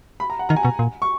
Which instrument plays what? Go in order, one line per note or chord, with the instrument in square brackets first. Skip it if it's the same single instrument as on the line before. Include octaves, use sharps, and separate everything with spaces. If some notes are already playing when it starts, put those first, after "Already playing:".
[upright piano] B5
A#5
F#5
[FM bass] D#3 [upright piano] A#5
[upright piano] G#5
[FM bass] B2 [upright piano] A#5
[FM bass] A#2
[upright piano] C#6